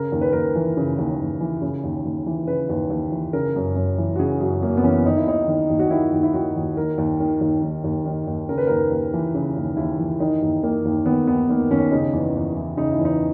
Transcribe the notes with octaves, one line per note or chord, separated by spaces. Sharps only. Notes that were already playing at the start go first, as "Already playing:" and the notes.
Already playing: C#3 A#4
D#2
B4
D#2 A#4
E3
C#3
D#2
D#2
E3
C#3
D#2
D#2
E3
C#3 B4
D#2
D#2
E3
C#3 A#4
F#2
F#2
E3
F#4
C#3 G#4
F#2 F#4
F#2 A#3
B3
E3 C#4
D#3 D#4
E4
D#2 D#4
D#3
D#2
F#4
D#3 E4
D#2
E4
D#3 F#4
D#2
D#3 A#4
D#2
D#3
D#2
D#3
D#2
D#3
D#2
C#3 A#4
B4
D#2 A#4
D#2
E3
C#3
D#2
D#2 E4
E3
D#3 D#4
D#2
D#3 A#3
D#2
D#3 B3
D#2 B3
D#3 A#3
D#2 C#4
C#3 D#4
E2
E2
E3
C#3 D#4
E4
E2
D#4